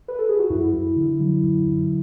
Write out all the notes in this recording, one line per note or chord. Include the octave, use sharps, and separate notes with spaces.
B4
A4
G#4
F#4
F#2 E4
F#2
D3
F#3
F#2
F#2